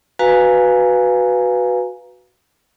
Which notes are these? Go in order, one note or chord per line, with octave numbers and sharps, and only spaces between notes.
F#4 B4 F5 G#5 A#5